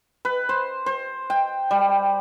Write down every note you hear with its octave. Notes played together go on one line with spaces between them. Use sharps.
B4
C5
C5
G5
G3